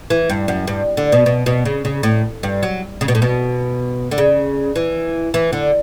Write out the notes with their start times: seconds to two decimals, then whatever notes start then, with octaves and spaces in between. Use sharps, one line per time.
0.10 E3
0.30 G2
0.48 F#2
0.67 G2
0.97 D3
1.12 B2
1.26 B2
1.46 B2
1.65 C#3
1.85 C#3
2.03 A2
2.43 G2
2.63 F#3
3.01 C#3
3.08 B2
3.15 A2
3.22 B2
4.11 D3
4.18 C#3
4.76 E3
5.34 E3
5.53 D3